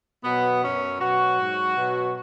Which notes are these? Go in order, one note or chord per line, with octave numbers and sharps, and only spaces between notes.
B2 F#3 B3
F#2 F#3 C#4
B2 F#3 F#4
G#2 F#3
B2 F#3